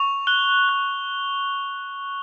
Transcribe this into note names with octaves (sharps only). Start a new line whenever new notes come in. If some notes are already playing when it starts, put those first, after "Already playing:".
Already playing: C#6 F7
F#6 G7
F#6